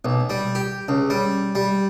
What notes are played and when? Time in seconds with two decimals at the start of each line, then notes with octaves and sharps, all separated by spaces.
0.05 B1
0.30 G3
0.55 G4
0.88 C#2
1.10 G3
1.55 G3